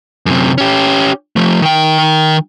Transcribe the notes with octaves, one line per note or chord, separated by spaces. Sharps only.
F#2 C3
C#4 G4
F3 A3
D#3 G5